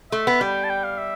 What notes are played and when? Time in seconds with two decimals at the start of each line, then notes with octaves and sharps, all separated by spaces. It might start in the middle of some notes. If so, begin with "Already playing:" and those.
0.12 A3 E5
0.27 B3
0.41 G3 G5
0.64 A5
0.70 G5
0.84 F5
0.98 E5